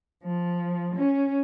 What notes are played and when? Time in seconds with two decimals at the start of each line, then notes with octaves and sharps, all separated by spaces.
0.24 F3
0.95 C#4